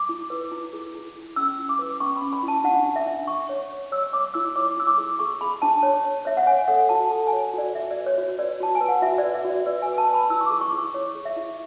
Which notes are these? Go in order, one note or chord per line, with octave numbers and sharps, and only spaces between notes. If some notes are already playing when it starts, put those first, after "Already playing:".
Already playing: D6
E4
B4
E4
G#4
E4
G#4
C#4 E6
E4
D6
B4
C#4 C#6
B5
C#4
B5
E4
A5
D4 F#5
D4
E5
D4
D4 C#6
C#5
C#5
C#5 E6
C#5 D6
E4 E6
C#5 D6
E4 E6
D6
G#4
G#4 C#6
G#4 B5
D4 A5
C#5
C#5
C#5 E5
F#5
C#5 G#5
A4 F#5
F#4 A5
A4 A5
G#5
C#5
F#4 D5
F#4 E5
D5
B4
C#5
F#4 C#5
B4 D5
F#4 A5
G#5
B4
F#5
F#4 E5
B4 D5
E5
F#4 D5
B4 D5
B4 G#5
A5
B4
B5
E4 E6
C#6
G#4 D6
C#6
E4
C#6
C#5
G#4
E5
E4